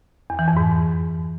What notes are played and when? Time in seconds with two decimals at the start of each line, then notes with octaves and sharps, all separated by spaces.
0.30 E2
0.39 E3
0.48 F2
0.57 G#2